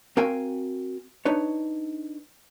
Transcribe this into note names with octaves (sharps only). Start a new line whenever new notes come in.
C4 F#4 A#4 F5 G5 G#5
D4 D#4 B4 C#5